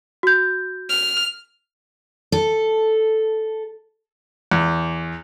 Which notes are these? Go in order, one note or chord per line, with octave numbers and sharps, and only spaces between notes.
F#4 G6
F6
A4
E2